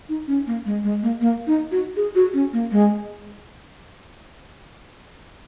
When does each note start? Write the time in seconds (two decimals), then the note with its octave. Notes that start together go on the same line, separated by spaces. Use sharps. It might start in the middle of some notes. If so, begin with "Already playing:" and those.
0.09 D#4
0.27 C#4
0.47 A#3
0.66 G#3
0.83 G#3
1.03 A#3
1.21 A#3
1.47 D#4
1.72 F#4
1.96 G#4
2.15 F#4
2.34 C#4
2.53 A#3
2.71 G#3